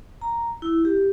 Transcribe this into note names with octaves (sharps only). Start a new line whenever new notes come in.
A#5
E4
G4